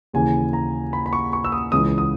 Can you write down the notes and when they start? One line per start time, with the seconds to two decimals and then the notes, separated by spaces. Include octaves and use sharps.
0.13 D#2 C#3 E3 G#5
0.53 A#5
0.93 B5
1.06 B5
1.13 C#6
1.33 C#6
1.44 E6
1.52 D#6
1.72 C#2 C#3 E3 D#6
1.98 D#6